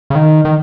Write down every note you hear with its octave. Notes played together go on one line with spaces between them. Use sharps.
C#3
D#3
D#3